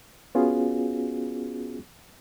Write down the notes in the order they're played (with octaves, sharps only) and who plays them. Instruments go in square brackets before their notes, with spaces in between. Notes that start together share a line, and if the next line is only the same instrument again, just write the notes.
[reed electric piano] B3 C#4 F4 F#4 G#4